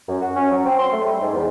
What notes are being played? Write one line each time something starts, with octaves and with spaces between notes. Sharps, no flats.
F#2
F#4
C#4
F#3
C4
C6
A3
G3
G#2
E2